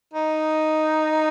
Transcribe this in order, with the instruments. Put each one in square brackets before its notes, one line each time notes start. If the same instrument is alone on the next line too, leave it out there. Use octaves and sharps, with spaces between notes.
[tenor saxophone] D#4